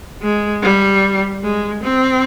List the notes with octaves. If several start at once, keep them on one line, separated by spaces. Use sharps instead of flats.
G#3
G3
G#3
C4